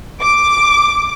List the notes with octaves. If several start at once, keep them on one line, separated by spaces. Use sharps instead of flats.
D6